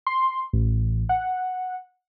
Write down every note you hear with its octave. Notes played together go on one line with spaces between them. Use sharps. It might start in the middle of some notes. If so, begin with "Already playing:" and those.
C6
A1
F#5